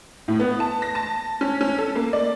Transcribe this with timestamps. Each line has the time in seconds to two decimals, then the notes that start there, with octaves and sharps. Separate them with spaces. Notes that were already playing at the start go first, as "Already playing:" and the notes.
0.28 A2
0.39 B3
0.60 A5
0.82 A#6
0.95 A5
1.41 C#4
1.61 C#4
1.78 A4
1.95 A#3
2.13 D5